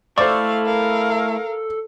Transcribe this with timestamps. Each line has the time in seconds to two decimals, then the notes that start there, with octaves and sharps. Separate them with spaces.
0.18 A3 E4 A4 C5 D5 F5 C#6
0.66 A#4 F5